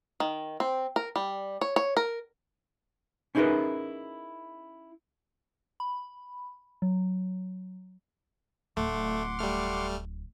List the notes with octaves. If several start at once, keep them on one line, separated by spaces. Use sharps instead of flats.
D#3
C4
A#4
G3
C#5
C#5
A#4
C#4 D#4 E4 G#4 A#4 B4
B5
F#3
D1 A3 F#5 C6 D6
G3 A3 F6